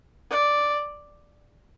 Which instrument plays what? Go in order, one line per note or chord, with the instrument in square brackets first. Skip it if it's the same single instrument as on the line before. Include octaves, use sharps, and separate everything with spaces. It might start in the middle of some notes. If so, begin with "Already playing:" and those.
[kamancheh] D5